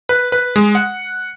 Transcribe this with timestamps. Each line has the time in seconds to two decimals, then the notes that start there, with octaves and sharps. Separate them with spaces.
0.09 B4
0.32 B4
0.56 G#3
0.75 F#5